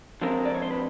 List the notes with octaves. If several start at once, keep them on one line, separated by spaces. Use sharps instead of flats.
D3 F3 G#3 C4 A#4
D5
C#5
C5
B4